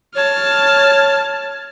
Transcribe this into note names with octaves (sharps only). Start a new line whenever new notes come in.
C#5 A5 F6